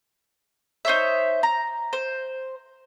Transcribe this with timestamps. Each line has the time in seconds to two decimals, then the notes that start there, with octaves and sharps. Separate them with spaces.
0.85 D#4 C5 C#5 E5
1.43 A#5
1.93 C5